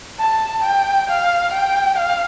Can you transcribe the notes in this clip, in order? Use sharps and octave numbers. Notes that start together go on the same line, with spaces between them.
A5
G5
F5
G5
F5